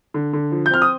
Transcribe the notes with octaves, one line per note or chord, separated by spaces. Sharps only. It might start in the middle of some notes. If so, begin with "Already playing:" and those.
D3
D3
F3
G6
C4 F6
D#6